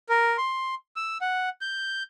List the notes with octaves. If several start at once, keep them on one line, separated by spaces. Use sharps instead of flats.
A#4
C6
E6
F#5
G6